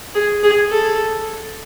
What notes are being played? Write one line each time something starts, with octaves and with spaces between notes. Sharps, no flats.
G#4
G#4
A4